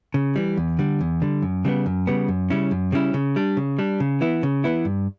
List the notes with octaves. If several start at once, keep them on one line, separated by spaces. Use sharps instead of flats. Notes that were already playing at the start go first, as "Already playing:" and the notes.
C#3
E3 G3
E2
D3 G3
E2
D3 G3
F#2
C#3 G3 B3
F#2
C#3 G3 B3
F#2
C#3 G3 C#4 E4
F#2
C#3 G3 C#4 E4
C#3
G3 D4
C#3
G3 D4
C#3
E3 B3 E4
C#3
E3 B3 E4
G2